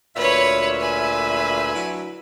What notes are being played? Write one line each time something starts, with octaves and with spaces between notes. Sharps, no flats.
D2 A#2 B4 C#5 E5
B4 G#5
F#3 D4 E4